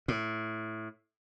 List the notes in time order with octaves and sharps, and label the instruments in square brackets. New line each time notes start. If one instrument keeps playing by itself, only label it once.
[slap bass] A2